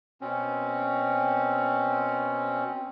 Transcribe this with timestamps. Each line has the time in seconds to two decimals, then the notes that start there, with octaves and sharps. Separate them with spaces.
0.21 B2 C4 C#4